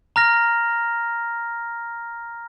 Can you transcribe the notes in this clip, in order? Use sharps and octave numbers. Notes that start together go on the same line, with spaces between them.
A#5 F6 A#6